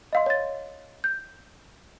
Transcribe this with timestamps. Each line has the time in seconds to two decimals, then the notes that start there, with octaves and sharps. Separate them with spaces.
0.13 D#5 F5 C6
0.26 C#5 A6
1.04 G6